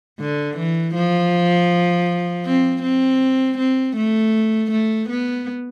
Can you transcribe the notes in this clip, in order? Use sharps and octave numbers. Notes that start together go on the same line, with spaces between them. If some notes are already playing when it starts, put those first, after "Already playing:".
D3
E3
F3
C4
C4
C4
A3
A3
B3